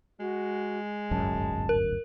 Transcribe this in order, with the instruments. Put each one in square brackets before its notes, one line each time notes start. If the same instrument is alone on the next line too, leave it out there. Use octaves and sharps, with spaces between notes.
[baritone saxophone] G#3 [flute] F#4
[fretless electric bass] D1 G1 F#2 [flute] A5
[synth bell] A#4